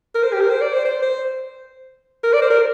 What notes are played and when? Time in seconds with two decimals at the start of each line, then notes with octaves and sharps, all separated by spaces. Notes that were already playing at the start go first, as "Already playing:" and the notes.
0.14 A#4
0.23 C5
0.33 G4
0.41 A#4
0.50 C5
0.61 D5
0.73 C5
0.85 C5
1.02 C5
2.24 A#4
2.33 D5
2.42 C5
2.50 A#4